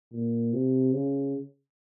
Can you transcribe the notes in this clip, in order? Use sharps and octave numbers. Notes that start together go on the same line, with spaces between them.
A#2
C3
C#3